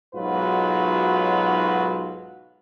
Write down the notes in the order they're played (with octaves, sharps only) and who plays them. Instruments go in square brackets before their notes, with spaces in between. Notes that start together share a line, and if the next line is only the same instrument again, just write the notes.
[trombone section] B1 G#2 F#3 F4 F#4 B4